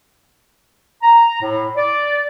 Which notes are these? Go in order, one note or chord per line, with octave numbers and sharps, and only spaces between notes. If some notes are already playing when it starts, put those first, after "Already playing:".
A#5
A2
D5